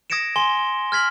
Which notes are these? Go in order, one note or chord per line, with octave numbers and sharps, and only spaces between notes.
D#6 G#6 A#6 C#7 D7 E7
G#5 C6 G7
F6 G#6 B6 F#7